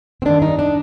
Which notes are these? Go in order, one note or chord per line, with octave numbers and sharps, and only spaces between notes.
C4
G2 D#3 D4
D#4
D4